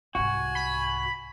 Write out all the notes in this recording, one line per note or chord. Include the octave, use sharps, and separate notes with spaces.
C2 G#2 F#4 G#5
B5